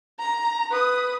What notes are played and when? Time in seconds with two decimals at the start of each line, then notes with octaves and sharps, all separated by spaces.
0.19 A#5
0.71 B4 D#6